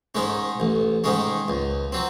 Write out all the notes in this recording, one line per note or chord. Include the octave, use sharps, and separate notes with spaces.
G#2 D#3 G#3 C#4
A1
G#2 D#3 G#3 C#4
C#2
F#3 C4